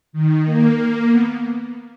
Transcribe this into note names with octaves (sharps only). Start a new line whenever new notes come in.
D#3
A#3
B3